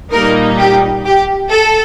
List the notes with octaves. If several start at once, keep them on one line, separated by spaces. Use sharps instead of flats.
A#2 G3 A#3 D#4 A#4
G4
G4
A4